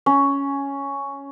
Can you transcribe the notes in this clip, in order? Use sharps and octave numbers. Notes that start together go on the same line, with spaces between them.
C#4